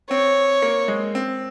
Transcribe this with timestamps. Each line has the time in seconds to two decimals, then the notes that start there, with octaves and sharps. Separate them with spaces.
0.10 C4 C#5
0.62 A#3
0.88 G#3
1.15 C4